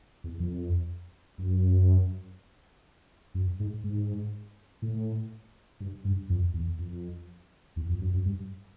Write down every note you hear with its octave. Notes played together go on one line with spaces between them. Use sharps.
E2
F2
F#2
F#2
G#2
G#2
A2
G2
G2
F2
E2
F2
E2
F2
F#2
F#2
G2